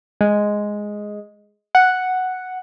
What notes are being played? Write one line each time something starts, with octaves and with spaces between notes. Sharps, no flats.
G#3
F#5